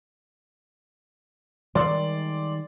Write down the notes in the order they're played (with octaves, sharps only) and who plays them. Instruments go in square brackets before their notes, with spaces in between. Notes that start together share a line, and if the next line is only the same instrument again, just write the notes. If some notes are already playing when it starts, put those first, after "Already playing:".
[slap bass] D#3 G3 G#3 [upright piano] D5 C6